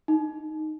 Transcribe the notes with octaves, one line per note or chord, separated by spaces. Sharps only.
D#4